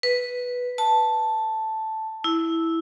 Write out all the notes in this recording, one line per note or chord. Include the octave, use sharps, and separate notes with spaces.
B4
A5
E4